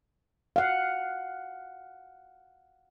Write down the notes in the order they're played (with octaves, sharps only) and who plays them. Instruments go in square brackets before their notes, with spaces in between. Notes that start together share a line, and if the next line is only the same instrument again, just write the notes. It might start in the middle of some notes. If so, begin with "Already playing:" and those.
[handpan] F5 F#5